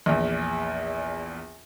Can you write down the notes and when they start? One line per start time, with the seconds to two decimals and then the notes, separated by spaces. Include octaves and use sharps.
0.06 A#1 E2